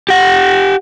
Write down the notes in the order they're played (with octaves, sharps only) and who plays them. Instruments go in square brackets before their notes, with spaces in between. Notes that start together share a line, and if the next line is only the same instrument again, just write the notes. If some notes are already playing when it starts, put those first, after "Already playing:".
[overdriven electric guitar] G4 F#5